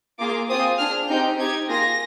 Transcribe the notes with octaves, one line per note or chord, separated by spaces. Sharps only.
A#3 F4 G#4 D6
C4 F4 G#4 D#6
D4 G#4 F6
C4 D#4 G4 G6
C4 D#4 G4 G#6
A#3 F4 G#4 A#6